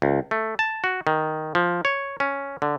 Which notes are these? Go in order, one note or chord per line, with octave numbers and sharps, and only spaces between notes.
C#2
A3
A5
F#4
D#3
F3
C#5
C#4
D3